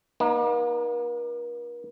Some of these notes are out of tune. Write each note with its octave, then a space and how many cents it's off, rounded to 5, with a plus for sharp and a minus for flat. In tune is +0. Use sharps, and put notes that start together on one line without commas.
A#3 +45 D#4 +0